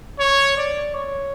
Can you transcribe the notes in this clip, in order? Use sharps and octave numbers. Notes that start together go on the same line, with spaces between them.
C#5
D5
C#5